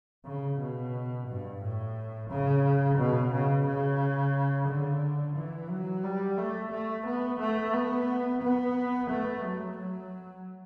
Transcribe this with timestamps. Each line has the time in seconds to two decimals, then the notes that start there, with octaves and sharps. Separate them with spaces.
0.26 C#3
0.60 B2
1.28 G2
1.62 A2
2.30 C#3
2.98 B2
3.33 C#3
3.66 C#3
4.68 D3
5.36 E3
5.70 F#3
6.04 G3
6.38 A3
6.72 A3
7.06 B3
7.40 A3
7.74 B3
8.42 B3
9.10 A3
9.44 F#3
9.78 F#3